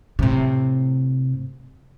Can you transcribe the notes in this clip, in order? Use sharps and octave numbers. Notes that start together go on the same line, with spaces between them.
A2 C3